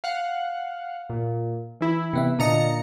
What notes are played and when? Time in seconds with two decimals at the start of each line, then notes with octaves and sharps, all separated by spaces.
0.04 F5 F#5
1.10 A#2
1.81 E3 E4
2.13 C3 B3 E5
2.39 A#2 D3 D4 D#5 A#5 C#7